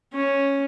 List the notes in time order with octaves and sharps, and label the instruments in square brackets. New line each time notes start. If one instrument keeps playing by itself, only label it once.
[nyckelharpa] C#4